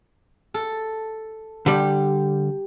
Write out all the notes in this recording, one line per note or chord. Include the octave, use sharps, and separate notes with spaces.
A4
D3 G3 G4